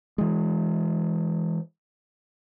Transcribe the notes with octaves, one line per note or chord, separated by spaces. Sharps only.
E3 G#3